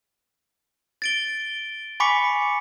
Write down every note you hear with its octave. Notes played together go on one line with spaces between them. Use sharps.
A6 D7 G7
G#5 B5 C#6 D6 B6 C#7